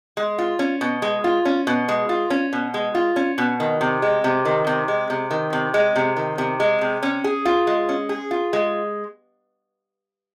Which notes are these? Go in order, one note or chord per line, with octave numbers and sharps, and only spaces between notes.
G#3
F4
C#4
B2
G#3
F4
C#4
B2
G#3
F4
C#4
B2
G#3
F4
C#4
B2
D#3
C3
G#3
C3
D#3
C3
G#3
C3
D#3
C3
G#3
C3
D#3
C3
G#3
C3
C#4
G#4
F4
G#3
C#4
G#4
F4
G#3